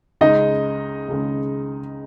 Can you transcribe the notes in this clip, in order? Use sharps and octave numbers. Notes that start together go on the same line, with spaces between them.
C#2 C#3 G#3 D#4 D#5
C#2 C#3 G#3